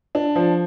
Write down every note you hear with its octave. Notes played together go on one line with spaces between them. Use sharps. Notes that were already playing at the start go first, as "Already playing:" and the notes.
D4
F3